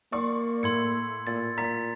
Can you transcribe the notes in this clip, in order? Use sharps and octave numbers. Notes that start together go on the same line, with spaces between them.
A#3 D5 C6 C#6
A2 C6 G#6 C#7
A#2 A6
A#2 A#5 B6